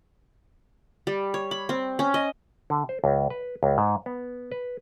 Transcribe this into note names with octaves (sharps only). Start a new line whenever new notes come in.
G3
C#5
B5
C4
C#4
D#5
D3
C5
C#2
B4
C#2
G#2
B3
B4